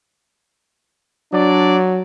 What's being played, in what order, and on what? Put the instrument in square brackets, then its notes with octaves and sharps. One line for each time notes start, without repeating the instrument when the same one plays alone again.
[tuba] F#3 [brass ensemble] D4 D5